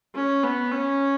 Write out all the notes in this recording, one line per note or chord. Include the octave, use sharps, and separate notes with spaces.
C#4
B3
C#4